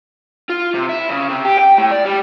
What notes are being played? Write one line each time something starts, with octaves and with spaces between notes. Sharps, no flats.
F4
C3
E4
C#3
C3
G4
G5
A2
D5
G3